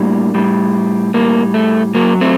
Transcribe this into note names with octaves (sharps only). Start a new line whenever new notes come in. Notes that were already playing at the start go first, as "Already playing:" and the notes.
Already playing: A2 G3 A#3 D4
A2 G3
A2 G3 A#3
A3
F#2 F#3 A#3
A3 C4